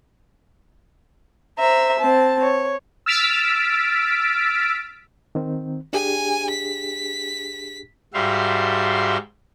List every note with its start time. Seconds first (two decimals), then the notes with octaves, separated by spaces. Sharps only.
1.58 C5 E5 A#5
1.98 C4 A5
2.40 C#5
3.06 E6 F6 A6 B6 D7
5.35 D#3 C4
5.93 D4 G4 G#4 G#5
6.50 B6
8.14 G#2 G3 F#4 E5 F5 C6